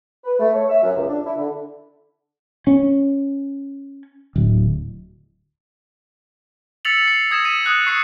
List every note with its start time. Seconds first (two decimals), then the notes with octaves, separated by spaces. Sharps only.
0.24 B4
0.39 A3
0.54 C#5
0.69 E5
0.83 F#2
0.96 C#2
1.08 D4
1.25 E4
1.37 D3
2.67 C#4
4.36 D1
6.85 E6 A6 B6 C#7 F7 F#7
7.08 C7
7.31 D#6 G#6 A#6 E7
7.45 D#6 B6 D#7
7.65 D#6 F#6 G#6
7.87 C#6 C7 C#7